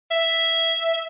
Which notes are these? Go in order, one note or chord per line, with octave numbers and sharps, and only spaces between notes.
E5